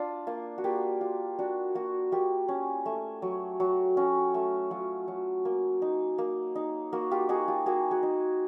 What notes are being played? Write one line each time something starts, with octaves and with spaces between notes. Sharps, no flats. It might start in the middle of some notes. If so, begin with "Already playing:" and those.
Already playing: D4 F4
A#3 F4
F#4
A#3 F4 G4
F4
D4 F#4
A#3 F#4
A#3 F4 G4
C#4
A3
F#3
F#3
C#4 F#4
A3
F#3 F4
F#3
A#3
D#4
A#3
D#4
A#3 F#4
F4 G4
D#4 F#4 G#4
F4 G4
A#3 F#4 G#4
F#4 G#4
D#4